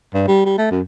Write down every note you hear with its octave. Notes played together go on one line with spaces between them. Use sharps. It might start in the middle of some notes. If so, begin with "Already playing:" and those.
G2
G3
G3
A3
F#2